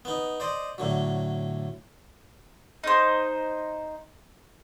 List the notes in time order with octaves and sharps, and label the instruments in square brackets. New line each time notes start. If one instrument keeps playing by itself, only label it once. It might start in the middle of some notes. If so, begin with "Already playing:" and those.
[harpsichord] B3 D#4
C5 D5 D#5
A2 D3 F#3
[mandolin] D#4 C5